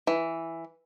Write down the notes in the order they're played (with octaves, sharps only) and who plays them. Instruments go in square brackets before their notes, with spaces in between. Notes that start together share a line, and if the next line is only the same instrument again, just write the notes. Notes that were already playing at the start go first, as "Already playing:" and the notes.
[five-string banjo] E3